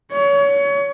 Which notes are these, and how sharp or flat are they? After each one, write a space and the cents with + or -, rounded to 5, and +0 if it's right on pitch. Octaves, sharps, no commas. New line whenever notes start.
C#5 +25